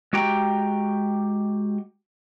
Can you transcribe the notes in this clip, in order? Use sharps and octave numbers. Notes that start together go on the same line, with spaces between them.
G#3 F#4 G4 G5 A#5